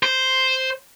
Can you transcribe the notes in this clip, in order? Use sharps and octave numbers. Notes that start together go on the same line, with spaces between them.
C5